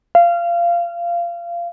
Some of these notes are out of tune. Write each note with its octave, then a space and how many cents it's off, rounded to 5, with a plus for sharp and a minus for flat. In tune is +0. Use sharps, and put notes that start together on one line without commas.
F5 -20